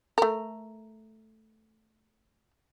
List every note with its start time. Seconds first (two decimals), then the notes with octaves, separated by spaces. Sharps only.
0.18 A3 A#4